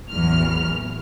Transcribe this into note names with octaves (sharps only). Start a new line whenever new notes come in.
A1 E2 F#3 F6